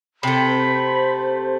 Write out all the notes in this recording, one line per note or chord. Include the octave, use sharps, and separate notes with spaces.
C3 A3 B5
C5